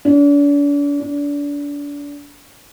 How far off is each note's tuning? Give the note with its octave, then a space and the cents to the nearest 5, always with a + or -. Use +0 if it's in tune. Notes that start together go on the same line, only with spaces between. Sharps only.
D4 -40
D4 -30